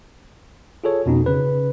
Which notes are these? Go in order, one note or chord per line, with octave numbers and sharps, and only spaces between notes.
F4 G#4 A4 C#5
F2 B2 C#4 D#4
C#3 B4